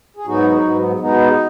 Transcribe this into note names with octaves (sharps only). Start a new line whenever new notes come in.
G#4
G#2 F#3 B3 D#4 F#4
G#2 F#3 B3
B2 G#3 B3 D#4